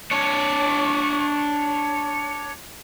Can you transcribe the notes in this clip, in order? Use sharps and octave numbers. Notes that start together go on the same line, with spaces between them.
D4 C#5